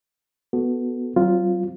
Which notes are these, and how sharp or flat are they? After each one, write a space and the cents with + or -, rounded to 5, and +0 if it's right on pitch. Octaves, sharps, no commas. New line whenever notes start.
B3 +0 F#4 +0 A4 +0
F#3 +35 C4 +0 F4 +0